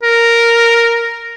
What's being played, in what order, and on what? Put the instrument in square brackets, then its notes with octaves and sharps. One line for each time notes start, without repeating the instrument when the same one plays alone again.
[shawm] A#4